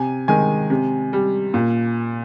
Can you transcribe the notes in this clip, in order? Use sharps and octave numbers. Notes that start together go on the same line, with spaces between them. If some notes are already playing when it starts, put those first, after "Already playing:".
Already playing: C3 G#5
D#3 G#3 G#5
C3
G3
A#2